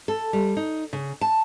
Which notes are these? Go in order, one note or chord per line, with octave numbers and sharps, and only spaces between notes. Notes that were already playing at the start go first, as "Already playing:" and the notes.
A4
G3
D#4
C#3
A5